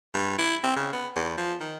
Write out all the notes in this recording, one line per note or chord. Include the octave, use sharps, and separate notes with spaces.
G2
E4
C4
C#3
B3
E2
F3
D#3